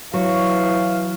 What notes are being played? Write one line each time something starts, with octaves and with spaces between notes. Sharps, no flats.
E3 F#3 C#5 F5